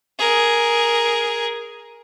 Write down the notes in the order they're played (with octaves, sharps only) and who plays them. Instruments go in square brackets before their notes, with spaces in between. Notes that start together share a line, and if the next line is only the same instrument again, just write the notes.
[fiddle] G#4 A#4